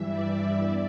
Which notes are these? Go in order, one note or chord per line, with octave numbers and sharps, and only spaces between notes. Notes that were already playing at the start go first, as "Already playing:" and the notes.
Already playing: G2 E3 G3 E5
D5
E2 D5